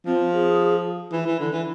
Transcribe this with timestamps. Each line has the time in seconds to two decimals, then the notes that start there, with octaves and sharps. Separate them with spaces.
0.06 F3 C4
0.33 G#4
1.12 E3
1.26 E3
1.39 D3
1.52 E3